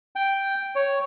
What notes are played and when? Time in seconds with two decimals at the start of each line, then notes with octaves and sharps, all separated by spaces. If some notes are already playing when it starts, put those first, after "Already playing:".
0.16 G5
0.75 C#5